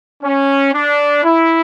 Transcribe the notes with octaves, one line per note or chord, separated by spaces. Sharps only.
C#4
D4
E4